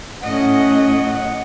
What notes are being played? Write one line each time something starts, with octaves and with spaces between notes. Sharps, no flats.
A2 C#4 D#5 F#5